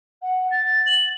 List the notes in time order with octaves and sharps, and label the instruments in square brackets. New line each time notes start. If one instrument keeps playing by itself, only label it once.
[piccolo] F#5
A6
F#7